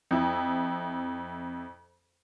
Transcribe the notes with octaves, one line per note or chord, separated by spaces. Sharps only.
F2 E4